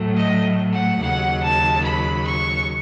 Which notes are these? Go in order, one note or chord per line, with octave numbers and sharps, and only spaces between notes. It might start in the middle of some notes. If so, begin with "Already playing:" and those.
Already playing: A2 F#3 A3
D#5
F#5
D#2 C#3 F#3 F#5
A5
B5
C#6